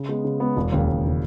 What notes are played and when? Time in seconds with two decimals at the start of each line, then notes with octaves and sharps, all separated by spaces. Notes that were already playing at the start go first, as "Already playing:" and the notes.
Already playing: C#3
0.09 G#3 B3
0.24 C#3
0.40 G#3 B3
0.57 E1
0.72 D#2 C#3
0.88 E1
1.07 C#3